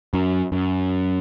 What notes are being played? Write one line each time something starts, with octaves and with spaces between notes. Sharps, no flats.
F#2
F#2